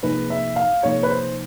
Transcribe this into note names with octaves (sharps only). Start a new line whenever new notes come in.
C3 F3 A#3 D#4 G#4 B4
E5
F5
C3 F3 A#3 D#4 G#4 C#5
B4
C5